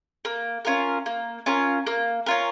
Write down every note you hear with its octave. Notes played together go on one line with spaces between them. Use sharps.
A#3
C#4 F4 A#4
A#3
C#4 F4 A#4
A#3
C#4 F4 A#4